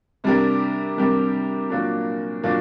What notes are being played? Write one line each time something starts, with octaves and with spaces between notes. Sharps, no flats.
C3 G3 D4 G4 A#4
C3 G3 D4 G4 A#4
A#2 F#3 A#3 D4
A#2 F#3 A#3 D4